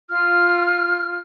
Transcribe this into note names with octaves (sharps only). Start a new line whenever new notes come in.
F4 F6